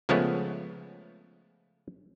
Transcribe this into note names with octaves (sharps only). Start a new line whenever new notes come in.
C#3 F3 G#3 A3 B3 C#5